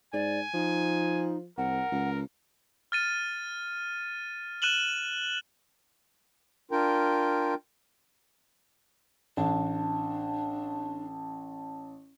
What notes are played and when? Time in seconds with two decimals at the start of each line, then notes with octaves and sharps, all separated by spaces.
0.13 G#2 D5 G#5
0.54 F3 D#4
1.58 C2 A#4 F#5
1.92 C#2
2.92 F6 A6 D#7
4.62 F#6 D#7 E7 F#7 G7
6.71 D4 F4 A#4 G5
9.37 A1 D4 A5